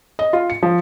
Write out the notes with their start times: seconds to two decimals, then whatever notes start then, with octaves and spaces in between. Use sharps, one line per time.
0.19 D#5
0.33 F4
0.50 C#7
0.63 F3